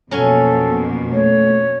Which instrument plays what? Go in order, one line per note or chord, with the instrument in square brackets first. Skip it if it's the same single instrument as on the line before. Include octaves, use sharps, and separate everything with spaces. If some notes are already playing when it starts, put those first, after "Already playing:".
[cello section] F2 B2 A#3 [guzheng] F#3 C#4 G#5 [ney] A4
[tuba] A3 [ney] C#5